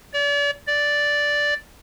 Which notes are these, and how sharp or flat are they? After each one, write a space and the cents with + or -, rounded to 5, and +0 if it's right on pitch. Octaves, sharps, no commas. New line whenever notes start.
D5 -40
D5 -5